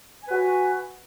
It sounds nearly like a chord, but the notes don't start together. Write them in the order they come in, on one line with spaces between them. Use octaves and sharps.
G#5 B4 F#4